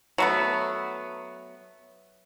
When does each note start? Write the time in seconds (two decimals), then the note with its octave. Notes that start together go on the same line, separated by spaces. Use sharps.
0.18 F#3 A3 B3